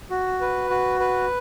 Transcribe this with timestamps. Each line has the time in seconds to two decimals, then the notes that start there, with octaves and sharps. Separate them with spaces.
0.10 F#4
0.41 B4
0.70 F#4
1.00 B4